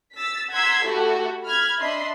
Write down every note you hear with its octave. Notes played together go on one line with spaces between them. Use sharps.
E6 A6 B6
F#5 A#5 C6 E6 G#6 B6
A3 E4 F#4 G4 A4
B5 F6 G#6
D4 D#5 E5 B5 C6